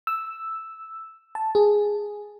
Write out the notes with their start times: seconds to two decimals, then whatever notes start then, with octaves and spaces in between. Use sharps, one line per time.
0.07 E6
1.35 A5
1.55 G#4